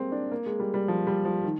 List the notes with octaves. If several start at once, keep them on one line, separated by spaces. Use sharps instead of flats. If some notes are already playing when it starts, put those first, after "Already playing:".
Already playing: G3 G#3 A#3 C4
D4
A#3
G#3
G3
G3
F3
G3
F3
D#3